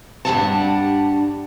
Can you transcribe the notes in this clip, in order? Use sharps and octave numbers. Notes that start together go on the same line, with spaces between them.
G2 G3 D4 E4 F#4 A5